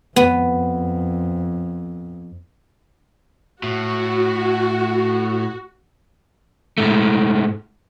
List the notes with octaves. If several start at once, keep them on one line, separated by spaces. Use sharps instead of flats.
F2 B3
A2 F#4
G#2 A3